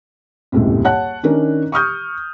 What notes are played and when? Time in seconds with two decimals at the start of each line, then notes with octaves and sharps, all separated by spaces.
0.52 D#1 C#2 F#2 A2 C3
0.84 C#5 F#5 A5 F#6
1.23 D#3 C#4 D4 A#4
1.72 C#6 D#6 F6 G6